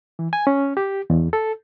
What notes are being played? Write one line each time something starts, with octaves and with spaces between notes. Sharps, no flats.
E3
G#5
C#4
G4
E2
A4